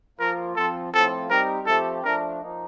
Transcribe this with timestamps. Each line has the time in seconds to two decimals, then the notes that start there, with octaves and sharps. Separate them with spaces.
0.19 F3 A#3 F4 A#4
0.56 F3 C4 F4 A4
0.93 A2 F3 C4 F4 A4
1.30 G3 C4 D#4 G4 A#4
1.67 F3 A3 C4 G4 A4
2.04 F3 A3 D4 A#4
2.42 F3 A#3 D#4